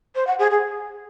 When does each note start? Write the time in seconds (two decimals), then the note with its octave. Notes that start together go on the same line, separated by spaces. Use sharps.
0.15 C5
0.27 F#5
0.39 G#4
0.51 G#4